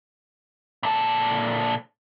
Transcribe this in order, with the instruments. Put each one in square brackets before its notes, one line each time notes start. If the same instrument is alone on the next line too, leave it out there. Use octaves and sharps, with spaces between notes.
[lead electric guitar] A#2 A4